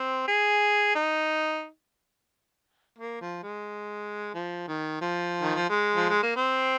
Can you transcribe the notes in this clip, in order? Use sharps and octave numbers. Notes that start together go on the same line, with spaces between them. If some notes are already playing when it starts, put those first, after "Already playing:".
Already playing: C4
G#4
D#4
A#3
F3
G#3
F3
D#3
F3
D#3
F3
G#3
F3
G#3
A#3
C4